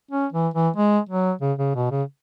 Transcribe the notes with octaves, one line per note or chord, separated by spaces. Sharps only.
C#4
E3
E3
G#3
F#3
C#3
C#3
B2
C#3